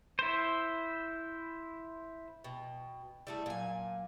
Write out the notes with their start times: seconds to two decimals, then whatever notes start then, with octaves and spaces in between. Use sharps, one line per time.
0.19 E4 C5
2.44 B2 G5
3.27 G3 A3 E4 G#4 A5
3.46 A#2 F#3 F5 G#5